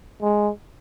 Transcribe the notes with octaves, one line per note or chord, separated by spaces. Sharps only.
G#3